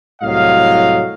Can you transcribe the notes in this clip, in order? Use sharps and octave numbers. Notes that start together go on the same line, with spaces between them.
C2 A2 F#3 D#5 F5